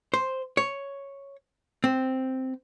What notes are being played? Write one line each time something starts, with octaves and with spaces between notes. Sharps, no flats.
C5
C#5
C4